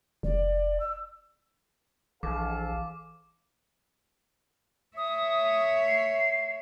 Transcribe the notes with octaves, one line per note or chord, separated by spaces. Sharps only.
F1 D5
E6
A#1 E3 G#4 A4 F5 D6
C#5 E5 D#6
C7